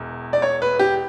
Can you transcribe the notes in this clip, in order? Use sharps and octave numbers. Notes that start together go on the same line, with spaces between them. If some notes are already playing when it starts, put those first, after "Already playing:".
Already playing: E1 E2
D5
C#5
B4
G4